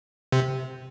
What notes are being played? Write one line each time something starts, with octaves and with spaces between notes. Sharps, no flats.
C3